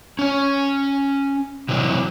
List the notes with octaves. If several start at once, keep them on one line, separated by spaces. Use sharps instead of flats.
C#4 G#5
C3 E3 F#3 G3